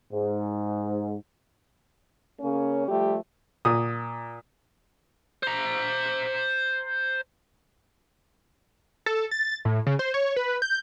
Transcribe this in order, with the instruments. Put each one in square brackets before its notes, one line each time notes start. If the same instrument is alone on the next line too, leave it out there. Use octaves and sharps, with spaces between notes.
[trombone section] G#2
[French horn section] C#3 A#3 C#4
F3 G3 A3 G4
[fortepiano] A#2 D#6
[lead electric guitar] C5 A#5
[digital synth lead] A4
A6
A2
C#3
C5
C#5
B4
G6